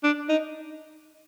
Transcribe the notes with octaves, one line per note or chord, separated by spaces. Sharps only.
D4
D#4